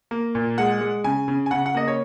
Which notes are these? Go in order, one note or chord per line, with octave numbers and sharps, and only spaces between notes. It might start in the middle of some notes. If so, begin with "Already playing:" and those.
A#3
A#2
G#3 F#5
G#3
C#3 G#5
C#3
G#5
C#3 F#5
F#5
A#3 D#5
C#5